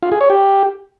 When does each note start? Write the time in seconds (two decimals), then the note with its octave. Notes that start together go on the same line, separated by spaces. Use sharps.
0.03 F4
0.12 G#4
0.21 C#5
0.30 G4